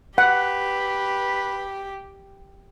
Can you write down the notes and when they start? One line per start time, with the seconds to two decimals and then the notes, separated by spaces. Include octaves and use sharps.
0.18 G4 B4 F#5